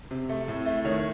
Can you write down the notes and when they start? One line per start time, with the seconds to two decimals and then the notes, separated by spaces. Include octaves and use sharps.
0.11 C3
0.29 A3
0.48 A2
0.66 A3
0.85 D#3 C#5